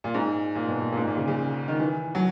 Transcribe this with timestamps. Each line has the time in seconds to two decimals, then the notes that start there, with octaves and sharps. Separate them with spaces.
0.04 A#2
0.14 G#2
0.55 A#2
0.68 B2
0.81 A#2
0.92 A#2
0.97 G#2
1.07 A#2
1.17 C#3
1.28 C#3
1.68 D#3
1.80 E3
2.15 F#3